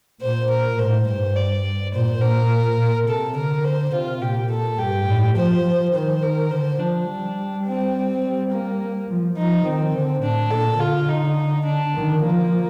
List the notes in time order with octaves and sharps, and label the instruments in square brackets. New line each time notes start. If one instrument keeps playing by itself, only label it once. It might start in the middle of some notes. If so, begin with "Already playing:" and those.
[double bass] A#2 [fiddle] C5
[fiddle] A#4
[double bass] A2 [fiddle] C5
[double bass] G2 [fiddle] C5
[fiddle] D5
[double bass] A#2 [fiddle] C5
[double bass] A#2 [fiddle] A#4
[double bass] A#2
[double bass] C3 [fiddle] A4
[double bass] D3 [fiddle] A#4
[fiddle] C5
[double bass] C3 [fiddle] F4
[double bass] A#2 [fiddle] G4
[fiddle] A4
[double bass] G2 [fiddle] G4
[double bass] A2
[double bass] F3 [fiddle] C5
[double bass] F3
[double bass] D#3 [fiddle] C5
[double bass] D#3 [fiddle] A#4
[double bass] D3 [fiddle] C5
[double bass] F3 [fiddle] D4
[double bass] G3
[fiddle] C4
[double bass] G3
[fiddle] A#3
[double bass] F3
[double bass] F3 [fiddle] D#4
[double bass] D#3 [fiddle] C4
[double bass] D3
[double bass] A2 [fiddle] D4
[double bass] A#2 [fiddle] A4
[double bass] D3 [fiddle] F4
[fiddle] D#4
D4
[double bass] D#3
[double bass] F3 [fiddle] A#3